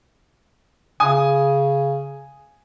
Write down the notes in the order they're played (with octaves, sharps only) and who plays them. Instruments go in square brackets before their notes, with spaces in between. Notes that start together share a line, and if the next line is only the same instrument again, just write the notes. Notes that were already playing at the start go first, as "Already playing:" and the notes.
[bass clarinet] C#3 [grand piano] G#5 D#6